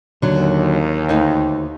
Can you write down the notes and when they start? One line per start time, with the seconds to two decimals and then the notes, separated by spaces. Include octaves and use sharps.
0.22 D#2 D3 F#3
1.09 D2 D#4